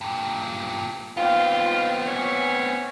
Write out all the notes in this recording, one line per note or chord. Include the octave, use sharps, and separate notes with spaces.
G2 A#2
D#2 B3 C4 F4
E3 C#4 C#5